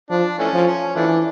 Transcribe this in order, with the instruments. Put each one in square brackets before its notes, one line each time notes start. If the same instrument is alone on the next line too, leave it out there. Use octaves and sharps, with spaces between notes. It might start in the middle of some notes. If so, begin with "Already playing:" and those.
[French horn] F3 [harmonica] D4
[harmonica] E3 A3 C#4
[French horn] F3
[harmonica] C#4
[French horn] E3 [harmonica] F3 A3 D4